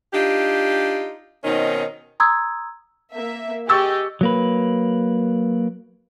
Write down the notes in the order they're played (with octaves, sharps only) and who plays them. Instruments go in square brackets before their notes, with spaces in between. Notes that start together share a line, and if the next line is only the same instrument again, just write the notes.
[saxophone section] D4 D#4 F4 G4
B2 D#3 C4 C#4 D#4
[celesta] A#5 C6 D#6 E6 G#6
[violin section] A#3 E5
[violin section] G4 G#4 D#5 [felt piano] C#6 E6 A6
[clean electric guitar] F#3 A#3 B4